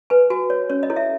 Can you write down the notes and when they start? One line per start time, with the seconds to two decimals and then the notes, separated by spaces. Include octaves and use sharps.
0.10 B4 G#5
0.30 F#4 G#5
0.50 C#5
0.70 C#4 C#5
0.83 D#5
0.90 E4 A4 C#5
0.96 E5